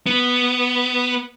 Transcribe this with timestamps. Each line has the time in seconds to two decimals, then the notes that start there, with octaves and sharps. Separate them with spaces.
0.07 B3